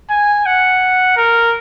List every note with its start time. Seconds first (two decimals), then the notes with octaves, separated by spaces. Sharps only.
0.10 G#5
0.46 F#5
1.17 A#4